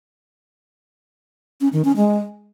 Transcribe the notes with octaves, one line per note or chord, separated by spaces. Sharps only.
C#4
D#3
C#4
G#3